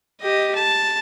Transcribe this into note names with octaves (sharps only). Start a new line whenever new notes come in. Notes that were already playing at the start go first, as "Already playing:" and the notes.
G4 D#5
A5